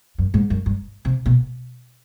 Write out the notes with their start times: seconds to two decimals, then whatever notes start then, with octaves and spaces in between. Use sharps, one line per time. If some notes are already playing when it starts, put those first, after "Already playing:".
0.18 F#2
0.34 G#2
0.50 F#2
0.66 G2
1.05 C3
1.26 B2